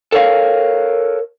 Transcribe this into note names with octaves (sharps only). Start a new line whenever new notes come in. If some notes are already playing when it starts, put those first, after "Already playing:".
A4 A#4 C#5 F5